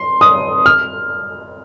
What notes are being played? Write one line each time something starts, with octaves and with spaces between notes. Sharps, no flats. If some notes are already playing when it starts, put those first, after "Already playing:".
Already playing: C6
D#6
F6